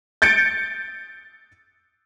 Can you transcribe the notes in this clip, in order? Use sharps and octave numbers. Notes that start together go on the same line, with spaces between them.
G6 A6 C#7 D7